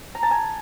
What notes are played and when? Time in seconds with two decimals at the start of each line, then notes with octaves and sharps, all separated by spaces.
0.15 A#5
0.23 A5
0.31 G#5